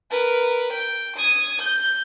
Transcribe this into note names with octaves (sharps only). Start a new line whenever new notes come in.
A#4 B4
G5
D#6 G#6
G6